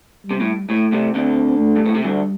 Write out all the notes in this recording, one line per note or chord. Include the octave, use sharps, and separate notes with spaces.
G3
C3
A2
A2 A3
C2 C3
D2 D3 C4
A3
G2
A2
C3
D2 D3 G3